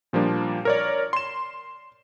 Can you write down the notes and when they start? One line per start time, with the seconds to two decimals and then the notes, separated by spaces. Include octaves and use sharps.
0.13 A#2 F3 G3 A#3 D4
0.65 A#4 C#5 D5
1.13 C6 E7